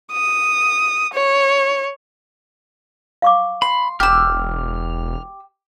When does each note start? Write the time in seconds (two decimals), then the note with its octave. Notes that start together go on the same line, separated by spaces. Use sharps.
0.12 D#6
1.13 C#5
3.22 F5 C#6 D6
3.62 B5 C6
4.00 E1 G4 E6 F6